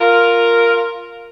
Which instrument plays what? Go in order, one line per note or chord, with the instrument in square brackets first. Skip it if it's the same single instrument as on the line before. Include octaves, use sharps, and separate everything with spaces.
[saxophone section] F4 A#4